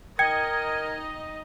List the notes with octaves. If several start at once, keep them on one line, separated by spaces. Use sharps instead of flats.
D#4 A#4 D#5 G5 G#6 C#7